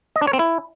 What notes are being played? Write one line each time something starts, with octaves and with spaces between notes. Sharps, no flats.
D#5
D4
C#5
C4
E4